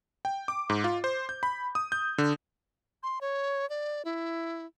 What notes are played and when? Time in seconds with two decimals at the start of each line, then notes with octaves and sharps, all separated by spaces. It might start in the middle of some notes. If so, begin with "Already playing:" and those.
0.25 G5
0.48 D6
0.70 G#2
0.84 F4
1.04 C5
1.29 G6
1.43 B5
1.75 D#6
1.92 G6
2.18 D3
3.03 C6
3.21 C#5
3.70 D5
4.05 E4